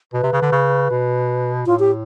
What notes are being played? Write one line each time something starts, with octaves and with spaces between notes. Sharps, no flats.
B2 B4
C3
C#3
D3
C#3
B2
A2 F4
G4